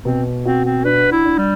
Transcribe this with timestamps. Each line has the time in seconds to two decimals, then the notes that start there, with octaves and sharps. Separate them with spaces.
0.05 B2 C4
0.45 C4 F#4
0.65 C4
0.85 D4 B4
1.12 E4
1.25 D4
1.38 G3